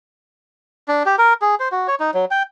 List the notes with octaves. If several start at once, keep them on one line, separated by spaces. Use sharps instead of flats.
D4
G4
A#4
G#4
C5
F#4
C#5
D#4
F#3
G5